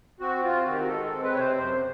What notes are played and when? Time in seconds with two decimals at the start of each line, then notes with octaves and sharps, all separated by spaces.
0.20 C4 F#4
0.43 C3 F4
0.66 D#3 F#4
0.72 G4
0.80 F#4
0.88 G#3 A4
1.05 A4
1.11 C4
1.23 B4
1.34 C3 C#5
1.39 C5
1.57 F#2 C5